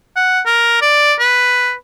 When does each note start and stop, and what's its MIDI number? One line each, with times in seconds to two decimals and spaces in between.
0.16 0.40 78
0.46 0.78 70
0.82 1.14 74
1.20 1.73 71